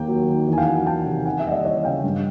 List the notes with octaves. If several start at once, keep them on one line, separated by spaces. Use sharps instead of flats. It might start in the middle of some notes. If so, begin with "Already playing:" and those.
Already playing: D#2 A#3 G5
F#3
D#3
E2
G#5
F5 G5
F#3 F#5 G#5
D#3 G5 A5
C3
D#2 F#5 G#5
E5 F#5
G3 D#5
D5 E5
E3 C#5 D#5
C#3 F5 G5
G2